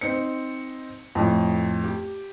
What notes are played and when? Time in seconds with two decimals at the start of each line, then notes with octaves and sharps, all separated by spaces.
0.01 C4 D#4 C5 C#7
1.15 F2 A2
1.84 G4